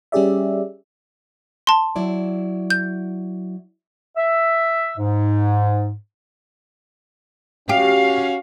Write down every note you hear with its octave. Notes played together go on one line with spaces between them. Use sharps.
G3 C#4 G4 G#4 D5 E5
A5 C6
F#3 E4 D5
G6
E5
G#2
C#4 F#4 G4 F5